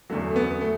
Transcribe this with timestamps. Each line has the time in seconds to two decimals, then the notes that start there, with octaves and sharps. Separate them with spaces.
0.10 E2 D3 F#3 A3
0.30 A3
0.36 B3
0.51 B3
0.61 A3